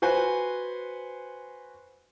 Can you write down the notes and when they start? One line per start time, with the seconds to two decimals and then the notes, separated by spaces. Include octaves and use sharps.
0.02 F#4 B4 C5 G#5